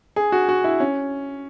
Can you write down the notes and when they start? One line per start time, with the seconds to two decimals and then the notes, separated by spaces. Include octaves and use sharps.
0.16 G#4
0.32 F#4
0.49 F#4
0.64 E4
0.80 C#4